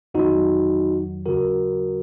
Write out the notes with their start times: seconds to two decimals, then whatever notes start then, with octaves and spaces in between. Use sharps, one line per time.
0.14 F2 D#3 F#3 D#4 F#4
1.26 D#2 C#3 F#3 F#4 A#4